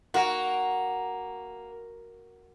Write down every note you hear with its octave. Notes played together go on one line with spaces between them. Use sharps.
A#3 F#4